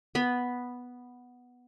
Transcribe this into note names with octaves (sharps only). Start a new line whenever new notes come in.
B3 B5